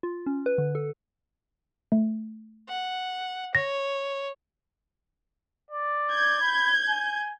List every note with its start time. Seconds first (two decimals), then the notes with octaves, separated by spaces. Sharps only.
0.03 F4
0.26 C#4
0.46 B4
0.58 D3
0.75 A4
1.92 A3
2.68 F#5
3.55 C#5 A#6
5.71 D5
6.12 G6 G#6
6.41 B5
6.89 G#5